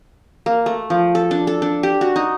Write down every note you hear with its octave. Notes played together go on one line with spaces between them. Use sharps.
A#3
A3
F3
A4
D4
A4
D4
G4
F#4
D#4